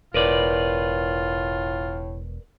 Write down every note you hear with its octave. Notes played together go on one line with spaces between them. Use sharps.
E1 A2 F4 A#4 B4 D5